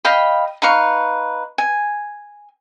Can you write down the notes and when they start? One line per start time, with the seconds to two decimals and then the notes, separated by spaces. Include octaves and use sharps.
0.05 D#5 F5 G5 B5
0.62 D#4 B4 F5 C#6
1.58 G#5